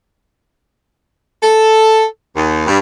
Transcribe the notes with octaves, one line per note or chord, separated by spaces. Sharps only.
A4
D#2
G2